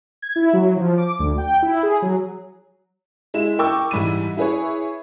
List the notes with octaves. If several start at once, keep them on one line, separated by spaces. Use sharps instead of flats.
G#6
E4
F#3
F3
D6
D2
G5
E4
G#4
F#3
G#3 E4 E7
A#4 G5 C#6 D6 E6
G#2 E3 G3 D#7
E4 G#4 B4 C#5